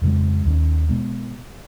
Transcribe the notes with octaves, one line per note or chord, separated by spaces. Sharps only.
F2 C#3 G#3
D#2 D#3 A#3 C#4
B2 G#3 B3